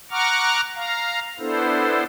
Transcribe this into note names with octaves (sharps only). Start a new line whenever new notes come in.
F#5 A#5 C#6 D6 F6
F5 A#5
B3 D4 E4 A4 C5